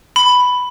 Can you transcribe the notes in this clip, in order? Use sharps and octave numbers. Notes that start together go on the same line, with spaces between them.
B5